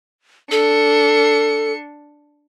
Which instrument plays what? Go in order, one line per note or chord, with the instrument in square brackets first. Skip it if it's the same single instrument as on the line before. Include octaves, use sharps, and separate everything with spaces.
[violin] D4 C#7 [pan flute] A4